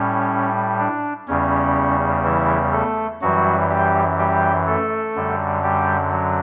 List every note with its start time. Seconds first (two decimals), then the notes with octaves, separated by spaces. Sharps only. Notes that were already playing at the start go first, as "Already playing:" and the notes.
Already playing: A2 G3 C#4
0.79 D4
1.28 E2 C#3 G3 C#4
2.24 E3 E4
2.73 A3 A4
3.22 F#2 E3 F#3 G3 F#4
3.69 G3 G4
4.18 G3 G4
4.67 A3 A4
5.15 F#2 D3 G3
5.63 G3 G4
6.12 F#3